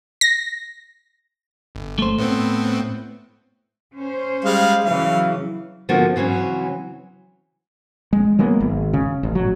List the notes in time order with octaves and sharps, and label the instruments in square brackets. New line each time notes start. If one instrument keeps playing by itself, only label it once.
[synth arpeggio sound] A#6
[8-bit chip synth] G1
[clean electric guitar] A3 C5
[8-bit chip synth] A2 B3 C4
[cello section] C#4 C5
[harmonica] G3 G#3 F5
[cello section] C#3 E3 F#3 [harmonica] F5
[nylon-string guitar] D3 F3 A#3 B3 C#4 F#4
C#3 E3 F#3 C4 C#4
[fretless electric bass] G#3
F#3 G#3 A#3 B3
G#1
C#3
A1
A1 F#3